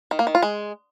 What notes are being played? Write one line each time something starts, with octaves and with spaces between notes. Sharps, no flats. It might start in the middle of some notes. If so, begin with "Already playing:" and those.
D#3
A#3
D#3
F4
G#3